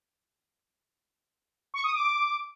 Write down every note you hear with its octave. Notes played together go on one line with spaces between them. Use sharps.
C#6
D#6
D6
D6